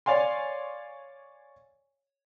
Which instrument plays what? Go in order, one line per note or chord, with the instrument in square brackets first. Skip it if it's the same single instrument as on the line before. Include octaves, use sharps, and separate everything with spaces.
[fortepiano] C#5 D5 F5 G#5 C6